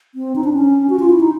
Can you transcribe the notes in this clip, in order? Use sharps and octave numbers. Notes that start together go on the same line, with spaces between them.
C4
D#4
D4
C#4
F#4
F4
E4
D#4